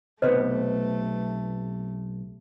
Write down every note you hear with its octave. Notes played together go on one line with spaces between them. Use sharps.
B1 C3 A3 B3 B4 C5 D#5